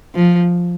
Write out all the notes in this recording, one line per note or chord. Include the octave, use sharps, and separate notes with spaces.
F3